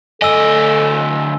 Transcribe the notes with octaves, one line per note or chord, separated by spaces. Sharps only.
D2 A4 D#5 G#5 E6 G7